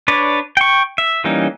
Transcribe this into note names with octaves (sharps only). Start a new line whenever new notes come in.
D4 B4 C#5 D5
G5 C#6
E5
E3 G3 A#3 C#4 D#4